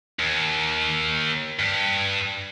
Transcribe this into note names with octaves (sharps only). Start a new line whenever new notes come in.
D#2
G2